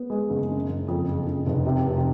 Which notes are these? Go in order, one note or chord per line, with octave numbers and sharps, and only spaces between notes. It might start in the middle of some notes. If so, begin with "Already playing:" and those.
Already playing: B3
G#3
F#1
C#3
F#1
F2
F#1
C#3
F1
C3
F1